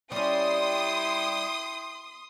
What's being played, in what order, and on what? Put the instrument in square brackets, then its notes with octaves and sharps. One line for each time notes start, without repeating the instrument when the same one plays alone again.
[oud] G3 C#4 [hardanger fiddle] E4 G5 [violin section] C6 D#6